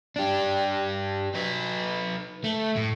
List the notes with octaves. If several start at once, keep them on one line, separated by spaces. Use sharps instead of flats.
D4 G4
D#4 B4
A3
A2